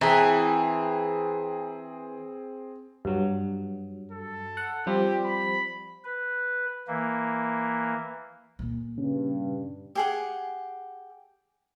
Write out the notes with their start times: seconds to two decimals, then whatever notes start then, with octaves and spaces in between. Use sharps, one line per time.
0.01 E3 C4 G#4 G5 A5 A#5
3.05 G2 F#3
4.12 A4
4.57 F#5
4.86 F3 G3 C4 G4
5.25 B5
6.04 B4
6.88 E3 A#3
8.59 A#2 D3
8.98 G2 C#3 C#4
9.95 G4 G#4 F#5